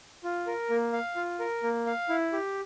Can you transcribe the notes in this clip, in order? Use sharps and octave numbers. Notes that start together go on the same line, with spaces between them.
F4
A#4
A#3
F5
F4
A#4
A#3
F5
E4
G4